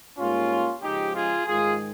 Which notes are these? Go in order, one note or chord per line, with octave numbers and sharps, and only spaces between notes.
G#2 G3 A#3 C#4 F4
C#2 C#3 F3 G#3 D#4 G4
F4 G#4
G#2 D#3 G#3 F4 G#4